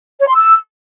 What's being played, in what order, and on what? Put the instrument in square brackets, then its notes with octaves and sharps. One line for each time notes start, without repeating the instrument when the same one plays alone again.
[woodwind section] C#5
C6
E6